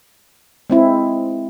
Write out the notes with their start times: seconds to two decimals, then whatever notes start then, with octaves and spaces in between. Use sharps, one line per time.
0.70 G#3 C4 E4